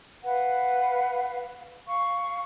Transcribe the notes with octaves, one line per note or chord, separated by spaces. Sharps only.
B4 F5 F#5
F5 C#6